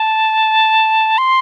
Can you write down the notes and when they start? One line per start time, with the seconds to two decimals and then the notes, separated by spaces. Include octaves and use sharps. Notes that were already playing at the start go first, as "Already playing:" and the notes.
Already playing: A5
1.18 C6